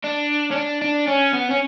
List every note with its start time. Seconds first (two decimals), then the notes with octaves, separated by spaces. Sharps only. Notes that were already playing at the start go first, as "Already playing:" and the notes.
0.04 D4
0.52 C#4
0.56 D4
0.82 D4
1.07 C#4
1.34 B3
1.51 C#4